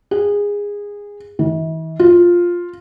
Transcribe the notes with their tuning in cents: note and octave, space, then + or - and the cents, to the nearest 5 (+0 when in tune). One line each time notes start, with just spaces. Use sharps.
G#4 -20
E3 -45
F4 +5